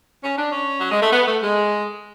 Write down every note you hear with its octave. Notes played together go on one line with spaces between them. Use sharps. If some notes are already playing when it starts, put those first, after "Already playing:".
C#4
D4
C#4
F#3
G#3
A3
B3
A3
G#3